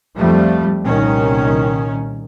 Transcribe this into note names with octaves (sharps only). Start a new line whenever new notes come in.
F2 F3 G3 A3
C2 A#2 D#3 C#4